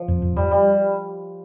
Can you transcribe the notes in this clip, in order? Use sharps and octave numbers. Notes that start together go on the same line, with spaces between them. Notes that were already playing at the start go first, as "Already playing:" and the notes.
Already playing: F3
F2
F2
F2 G3
G3